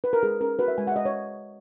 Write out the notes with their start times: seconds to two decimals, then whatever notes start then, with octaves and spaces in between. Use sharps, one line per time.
0.04 B4
0.13 A#4
0.23 G#3 G#4
0.41 C#4 A#4
0.59 F#4 B4
0.68 E5
0.78 G#3 G#5
0.87 E5 F#5
0.96 G#3 D#5
1.05 C#5